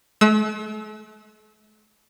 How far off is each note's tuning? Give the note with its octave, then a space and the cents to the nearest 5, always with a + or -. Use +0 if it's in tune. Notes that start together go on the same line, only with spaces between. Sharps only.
A3 -45 E6 -30